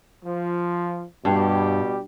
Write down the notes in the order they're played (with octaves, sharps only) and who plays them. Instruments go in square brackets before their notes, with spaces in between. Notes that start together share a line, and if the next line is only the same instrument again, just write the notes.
[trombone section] F3
[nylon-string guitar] G2 [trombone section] B2 G3 G4